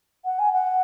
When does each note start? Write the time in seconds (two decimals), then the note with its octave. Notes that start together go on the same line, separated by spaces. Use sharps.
0.25 F#5
0.39 G#5
0.53 F#5